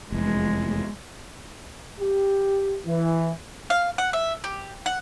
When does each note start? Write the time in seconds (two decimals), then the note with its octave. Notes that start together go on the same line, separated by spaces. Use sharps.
0.12 F1 E2 G#3
2.00 G4
2.87 E3
3.70 F5
3.98 F#5
4.13 E5
4.44 G4
4.86 F#5